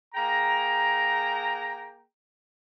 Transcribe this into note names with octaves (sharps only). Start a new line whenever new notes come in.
A#3 G#4 G5 A#5